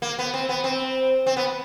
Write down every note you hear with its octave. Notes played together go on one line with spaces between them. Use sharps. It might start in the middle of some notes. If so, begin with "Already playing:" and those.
A#3
B3
C4
B3
C4
C4
B3